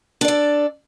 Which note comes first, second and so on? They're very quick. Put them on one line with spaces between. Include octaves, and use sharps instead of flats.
D4 D5 A4